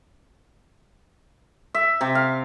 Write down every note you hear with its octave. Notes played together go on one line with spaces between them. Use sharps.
E5
C3
F5